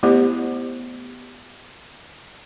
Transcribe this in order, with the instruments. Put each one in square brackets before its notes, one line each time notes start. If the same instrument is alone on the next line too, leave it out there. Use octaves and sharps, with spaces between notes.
[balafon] A3 B3 E4 G4 C5